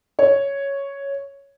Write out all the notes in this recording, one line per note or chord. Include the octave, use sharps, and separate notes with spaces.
C#5